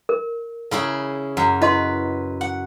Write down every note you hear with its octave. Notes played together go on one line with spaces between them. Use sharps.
A#4
C#3 E4 G#4
F#2
E4 B4 D#5 C6
F#5